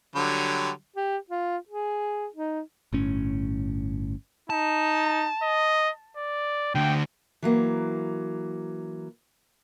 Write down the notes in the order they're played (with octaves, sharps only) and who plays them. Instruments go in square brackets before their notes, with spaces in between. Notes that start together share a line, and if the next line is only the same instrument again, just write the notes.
[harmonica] D3 F#3 G3
[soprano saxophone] G4
F4
G#4
D#4
[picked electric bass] G1 A2 C#4
[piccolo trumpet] D#4 [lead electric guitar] A5
[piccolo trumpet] D#5
D5
[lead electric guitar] D2 D3 [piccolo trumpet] G5
[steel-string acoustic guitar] E3 F#3 A#3